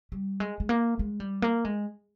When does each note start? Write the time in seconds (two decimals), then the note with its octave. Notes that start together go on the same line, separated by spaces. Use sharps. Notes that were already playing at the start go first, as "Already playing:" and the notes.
0.12 G3
0.40 G#3
0.60 G#3
0.69 A#3
0.99 G#3
1.20 G3
1.42 A#3
1.65 G#3